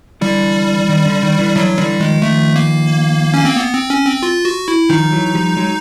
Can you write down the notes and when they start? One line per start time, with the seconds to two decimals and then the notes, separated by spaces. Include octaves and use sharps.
0.21 D3 E3 G3
0.89 D#3
1.05 D3
1.23 D#3
1.38 D3 E3
1.55 D3 E3 F#3
1.78 D3 E3 G3
1.99 D#3 F3 G#3
2.22 D#3 F3 A3
2.56 A#3
3.34 C#4
3.45 C4
3.56 B3
3.73 C4
3.90 C#4
4.06 C4
4.23 F4
4.45 F#4
4.68 E4
4.89 D#3 F3 D#4
5.12 E3 F#3
5.35 F3 G3
5.56 F#3 G#3